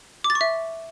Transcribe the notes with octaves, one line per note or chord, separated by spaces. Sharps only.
D6
A6
C#6
E5